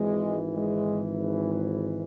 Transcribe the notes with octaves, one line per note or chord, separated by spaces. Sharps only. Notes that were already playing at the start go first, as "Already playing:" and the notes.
Already playing: G#1 G#2 E3 G#3
G#3